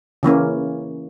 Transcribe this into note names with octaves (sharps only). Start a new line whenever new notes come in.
C#3 E3 A#3 C#4